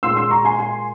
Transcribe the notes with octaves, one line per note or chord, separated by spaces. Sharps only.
A#2 G#3 C6 E6
C6 E6
A#5 C#6
G#5 C6
G#5 C6